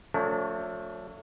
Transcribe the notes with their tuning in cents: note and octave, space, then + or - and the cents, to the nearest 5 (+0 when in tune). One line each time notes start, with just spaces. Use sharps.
F#3 -45 A3 +20 D4 -40